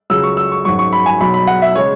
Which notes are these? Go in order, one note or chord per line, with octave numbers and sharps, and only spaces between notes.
C#2 C#3 F#3 E6
C#6
E6
C#6
G#1 F#2 F#3 C#6
C#6
B5
G#5
B1 B2 F#3 B5
B5
F#5
E5
C#3 G#3 C#5